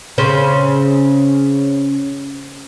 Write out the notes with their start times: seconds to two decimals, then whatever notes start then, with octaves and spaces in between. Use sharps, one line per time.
0.18 C#3 C4 C#4